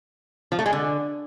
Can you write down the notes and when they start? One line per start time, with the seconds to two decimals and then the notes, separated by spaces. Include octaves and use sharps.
0.52 F3
0.59 A3
0.66 G#3
0.73 D3